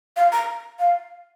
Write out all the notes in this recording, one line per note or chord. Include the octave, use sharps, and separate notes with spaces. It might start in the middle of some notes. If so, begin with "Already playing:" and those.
F5
A#5
F5